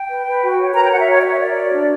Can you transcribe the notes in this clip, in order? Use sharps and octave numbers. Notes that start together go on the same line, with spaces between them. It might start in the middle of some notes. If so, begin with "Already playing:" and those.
Already playing: G5
B4
B4
F#4
C#5
A#4 A#5
G5
F#4 F#5
E5
F#4 C#5
D5
C#5 E5
A#4 D5
F#4
D4